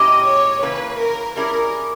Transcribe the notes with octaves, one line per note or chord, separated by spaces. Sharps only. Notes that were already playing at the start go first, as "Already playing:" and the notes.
Already playing: A#2 G#3 C#4 E4 G4 D#5
C#5
C#3 E3 A#3 B4
A#4
G3 C#4 E4 G#4 A#4